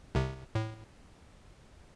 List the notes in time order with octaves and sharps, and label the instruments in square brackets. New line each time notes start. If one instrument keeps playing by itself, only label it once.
[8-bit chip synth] C2 C3
A2